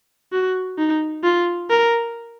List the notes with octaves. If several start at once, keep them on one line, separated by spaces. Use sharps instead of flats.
F#4
D#4
F4
A#4